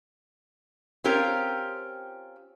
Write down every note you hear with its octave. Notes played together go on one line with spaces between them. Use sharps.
C4 C#4 F4 G4 A#4